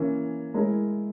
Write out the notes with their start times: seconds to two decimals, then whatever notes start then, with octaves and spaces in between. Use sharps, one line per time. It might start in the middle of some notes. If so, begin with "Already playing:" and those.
Already playing: E3 A#3 C#4
0.54 G#3 E4 A#4